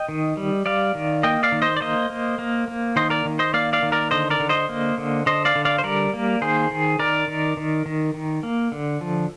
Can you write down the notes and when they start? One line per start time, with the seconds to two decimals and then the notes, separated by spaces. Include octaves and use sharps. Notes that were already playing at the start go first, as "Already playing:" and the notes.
Already playing: D#5 G5
0.09 D#3
0.37 G3
0.66 G3 D5 F5
0.95 D#3
1.23 A#3 D#5 G5
1.43 D5 F5
1.52 D#3
1.62 C5 D#5
1.77 D5
1.81 A#3 C5 D#5
2.10 A#3
2.39 A#3
2.68 A#3
2.96 D#3 C5 D#5
3.10 A#4 D5
3.25 D#3
3.39 C5 D#5
3.54 A#3 D5 F5
3.73 D5 F5
3.83 D#3
3.92 A#4 D5
4.11 D3 C5 D#5
4.30 A#4 D5
4.40 D3
4.49 C5 D#5
4.69 A#3
4.98 D3
5.26 D3 C5 D#5
5.45 D5 F5
5.55 D3
5.65 D5 F5
5.78 C5
5.84 G3 A#4 D5
6.14 A#3
6.41 D#3 G#4 C5
6.71 D#3
6.99 D#3 A#4 D5
7.28 D#3
7.57 D#3
7.86 D#3
8.14 D#3
8.43 A#3
8.72 D3
9.01 F3